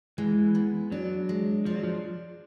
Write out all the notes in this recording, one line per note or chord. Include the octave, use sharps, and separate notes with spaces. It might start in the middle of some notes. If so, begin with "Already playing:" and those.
E3 G#3
B3
F#3 D4
G#3
F3 D4
F#3
F3